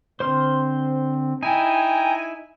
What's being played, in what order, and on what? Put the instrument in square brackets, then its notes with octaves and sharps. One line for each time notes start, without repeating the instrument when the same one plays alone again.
[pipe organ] D3 C4 [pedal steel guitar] C5 C6 F6
[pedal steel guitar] D#4 E4 [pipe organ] G5 A#5 [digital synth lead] G#5